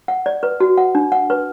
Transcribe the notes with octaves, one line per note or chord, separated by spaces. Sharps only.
F#5
D5
B4
F#4
F#5
D4
F#5
B4